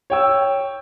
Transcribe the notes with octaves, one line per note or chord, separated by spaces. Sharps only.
C#5 G5 E6